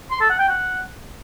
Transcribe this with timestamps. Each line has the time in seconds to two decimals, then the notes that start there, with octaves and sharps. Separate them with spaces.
0.11 C6
0.20 A4
0.30 F#5
0.39 G5
0.49 F#5